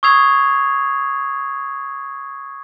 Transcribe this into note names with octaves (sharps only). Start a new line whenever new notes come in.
C#6 D#6 E6 G#6 C7 F7